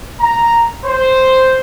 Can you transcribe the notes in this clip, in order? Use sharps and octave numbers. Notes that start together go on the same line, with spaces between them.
A#5
C5